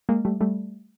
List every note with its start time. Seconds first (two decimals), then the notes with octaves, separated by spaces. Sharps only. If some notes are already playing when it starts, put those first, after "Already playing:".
0.09 G#3 A#3
0.25 G3 A3
0.41 G3 A3